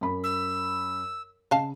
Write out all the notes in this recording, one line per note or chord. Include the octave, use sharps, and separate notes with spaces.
F#2 B5
E6
C#3 D#5 F5 A5